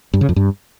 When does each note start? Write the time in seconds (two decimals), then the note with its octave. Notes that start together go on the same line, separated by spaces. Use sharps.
0.13 G2
0.21 C#3
0.29 F2
0.36 G2